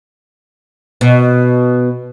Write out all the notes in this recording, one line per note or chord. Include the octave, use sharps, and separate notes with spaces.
B2